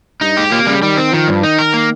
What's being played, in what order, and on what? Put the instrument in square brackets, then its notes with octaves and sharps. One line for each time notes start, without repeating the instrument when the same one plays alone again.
[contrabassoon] G2 [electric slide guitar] D#4
[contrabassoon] G#2 [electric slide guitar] G4
[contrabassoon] A#2 [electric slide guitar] A#3
[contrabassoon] C3
[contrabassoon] C#3 [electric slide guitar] G3
[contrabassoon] D#3 [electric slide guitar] G3
[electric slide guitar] C4
[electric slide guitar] D#3 [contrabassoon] F3
[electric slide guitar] G2
[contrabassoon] D#3 [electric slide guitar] D#4
[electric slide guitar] A#4
A#3